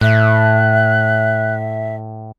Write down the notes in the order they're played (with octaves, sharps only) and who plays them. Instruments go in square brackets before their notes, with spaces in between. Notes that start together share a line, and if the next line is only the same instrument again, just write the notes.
[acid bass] A2 [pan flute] E5 [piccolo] F#6